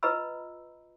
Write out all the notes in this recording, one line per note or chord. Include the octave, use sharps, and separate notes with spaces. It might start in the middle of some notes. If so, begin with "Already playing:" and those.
F4 B4 D#5 A#5 B5 E6